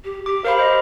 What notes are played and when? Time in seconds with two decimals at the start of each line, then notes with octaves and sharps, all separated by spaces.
0.05 G4
0.26 G4 D6
0.45 A#4 C5 F5 B5
0.59 C5 D#5